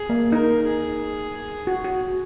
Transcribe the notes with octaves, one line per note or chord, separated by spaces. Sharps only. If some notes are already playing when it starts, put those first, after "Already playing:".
Already playing: G#4
A#3
D#4 A#4
G#4
F#4
F#4